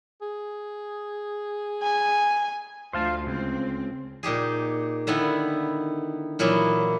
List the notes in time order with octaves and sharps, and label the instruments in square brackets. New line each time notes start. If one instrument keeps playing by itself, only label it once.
[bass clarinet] G#4
[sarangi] G#5
[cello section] D2 F4 [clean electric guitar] C5 F5 A5
[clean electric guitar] C#2 [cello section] C4
[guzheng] A#2 D#4 G4 G#4
D3 D#3 B3 E4
A#2 E3 F#3 A#3 B3 E4